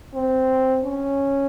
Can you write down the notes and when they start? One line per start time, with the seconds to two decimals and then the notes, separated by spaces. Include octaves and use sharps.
0.14 C4
0.84 C#4